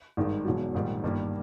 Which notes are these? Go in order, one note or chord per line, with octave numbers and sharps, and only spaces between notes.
G#1 G2 D#3 G#3
E1 E2 B2 F#3
A#1 G#2 D#3 G3
G1 G2 D#3 G3 A#3